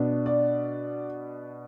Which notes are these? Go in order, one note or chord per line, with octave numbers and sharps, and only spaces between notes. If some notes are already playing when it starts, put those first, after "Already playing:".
Already playing: B2 B3 D4
D5